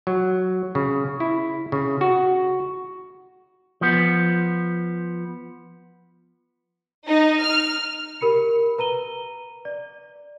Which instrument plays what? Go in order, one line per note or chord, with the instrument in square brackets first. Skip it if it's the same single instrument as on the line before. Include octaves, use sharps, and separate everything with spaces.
[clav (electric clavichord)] F#3
C#3
E4
C#3
F#4
[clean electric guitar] F3 B3
[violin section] D#4
F6
[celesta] G4 A#4 B5 C#7
B4 A#5 D#7 G7
D5